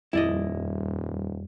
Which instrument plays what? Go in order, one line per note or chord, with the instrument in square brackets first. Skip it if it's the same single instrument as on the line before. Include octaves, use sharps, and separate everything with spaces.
[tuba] D#1 [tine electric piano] F2 G3 [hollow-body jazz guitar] E4 D5 D#5